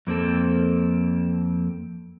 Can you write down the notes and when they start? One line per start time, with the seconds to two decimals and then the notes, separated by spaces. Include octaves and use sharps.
0.07 F2 A#3 C4 A4